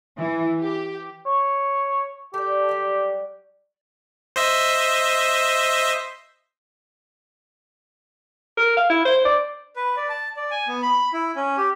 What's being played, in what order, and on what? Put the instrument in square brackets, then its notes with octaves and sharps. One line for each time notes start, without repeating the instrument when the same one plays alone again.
[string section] E3
G4
[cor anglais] C#5
[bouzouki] A3 D5 [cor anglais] G4
[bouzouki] F#3 G3
[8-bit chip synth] C5 D#5 E5
[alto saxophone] A#4
F5
E4
C5
D5
[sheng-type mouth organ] B4
D5
A5
D5
G#5
B3
B5
E4
C#4
G4